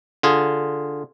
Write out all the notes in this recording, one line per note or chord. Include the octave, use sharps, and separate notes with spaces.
D3 F4 G#4